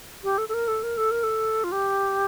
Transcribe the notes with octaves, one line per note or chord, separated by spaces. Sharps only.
G4
A4
A4
A#4
A4
A#4
A4
A#4
A4
F4
G4